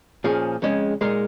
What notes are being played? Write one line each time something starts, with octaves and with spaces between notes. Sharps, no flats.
A#2 F3 C#4 G#4
F2 C#3 G#3 C#4
A#2 G#3 D#4 A#4